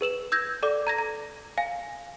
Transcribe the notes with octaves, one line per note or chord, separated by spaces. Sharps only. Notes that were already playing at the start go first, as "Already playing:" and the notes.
G#4 B4 E7 F#7
E6 G6 G#6 A#6
A4 D5 D6
A#5 G#6 A#6
A#5
F5 G#5